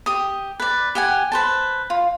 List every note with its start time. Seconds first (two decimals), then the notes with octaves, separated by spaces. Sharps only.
0.06 G4 D#6
0.60 B4 D5
0.95 G4 F#5 G#5
1.32 B4 C5 A5
1.90 F4